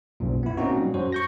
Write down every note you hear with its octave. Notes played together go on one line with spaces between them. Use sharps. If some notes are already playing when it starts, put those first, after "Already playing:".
B1 F#2 A#2
B3 E4
A#2 A#3 C4 C#4 D#4 F#4
F#3 G3
F#2 F#3 F#4 C5
C#6 G6 A#6